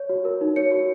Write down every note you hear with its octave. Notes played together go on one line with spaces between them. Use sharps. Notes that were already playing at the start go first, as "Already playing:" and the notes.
Already playing: C#5
F#4
A#4
D#4
C#5 C#7
F#4